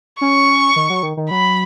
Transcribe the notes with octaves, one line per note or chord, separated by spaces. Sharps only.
C#4 C#6
D#3
F#3
D#3
D#3
F#3 B5